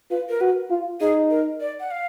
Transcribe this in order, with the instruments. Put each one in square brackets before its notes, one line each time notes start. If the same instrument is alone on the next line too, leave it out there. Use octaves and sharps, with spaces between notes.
[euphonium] F4 [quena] B4
[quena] A#4
[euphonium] F#4 [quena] B4
[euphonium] F4
[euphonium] D#4 [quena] G#4
[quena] A#4
D5
F#5
F5